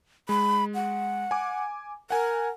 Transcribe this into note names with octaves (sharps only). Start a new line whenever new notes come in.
G#3 B5
F#5
G#5 D6
A#4 F#5 G#5